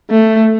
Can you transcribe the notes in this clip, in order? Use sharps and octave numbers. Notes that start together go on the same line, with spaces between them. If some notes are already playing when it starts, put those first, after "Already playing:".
A3